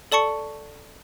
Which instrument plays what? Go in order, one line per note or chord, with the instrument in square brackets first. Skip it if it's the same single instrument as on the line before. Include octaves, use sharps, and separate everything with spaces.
[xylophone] A4 D5 A5 C#6 C#7